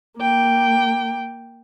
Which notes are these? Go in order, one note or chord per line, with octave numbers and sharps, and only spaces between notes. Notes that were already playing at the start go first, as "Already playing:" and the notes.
A#3 G5